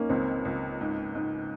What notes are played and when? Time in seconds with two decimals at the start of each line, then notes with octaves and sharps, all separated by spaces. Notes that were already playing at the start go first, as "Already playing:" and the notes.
Already playing: A#3 C#4 D#4
0.09 C#2 C4
0.45 C#2
0.81 G#2
1.15 G#2